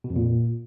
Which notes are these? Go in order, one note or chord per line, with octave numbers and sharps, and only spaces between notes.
B2
F2
A#2